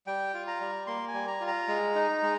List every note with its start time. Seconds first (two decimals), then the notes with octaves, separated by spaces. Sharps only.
0.07 G3 G5
0.34 F4
0.48 A#5
0.61 G3
0.87 A#3 C6
1.08 G#5
1.14 G3
1.27 A#5
1.41 F4
1.47 A#5
1.68 G#3
1.95 D#4
2.22 G#3